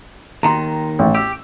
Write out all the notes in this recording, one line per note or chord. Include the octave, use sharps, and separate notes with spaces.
D#2 D#3 A#5 C6
A1
G4 E6